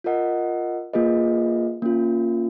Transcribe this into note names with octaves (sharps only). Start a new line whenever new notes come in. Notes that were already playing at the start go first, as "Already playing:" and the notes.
F4 A#4 D#5 F#5
A#3 F4 G#4 B4 D#5
A#3 C#4 F4